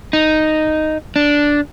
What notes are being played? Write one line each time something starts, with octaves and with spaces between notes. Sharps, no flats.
D#4
D4